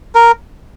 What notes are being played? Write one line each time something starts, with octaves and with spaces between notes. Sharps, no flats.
A#4